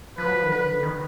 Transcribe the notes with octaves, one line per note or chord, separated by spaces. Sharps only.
F3 B4
F#3
F3
D#3
D3 B4
D#3